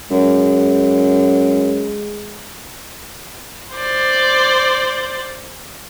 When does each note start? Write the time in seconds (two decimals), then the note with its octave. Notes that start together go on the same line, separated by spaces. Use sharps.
0.11 F#2 G#3
3.75 C5 D5